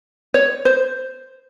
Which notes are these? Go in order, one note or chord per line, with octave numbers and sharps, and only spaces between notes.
C#5
C5